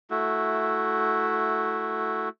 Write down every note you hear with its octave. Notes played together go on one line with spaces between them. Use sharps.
A3 E4 F#4